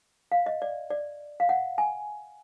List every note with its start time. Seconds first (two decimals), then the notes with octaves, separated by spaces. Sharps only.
0.32 F5
0.46 D#5
0.62 D5
0.90 D5
1.40 F5
1.49 F#5
1.78 G#5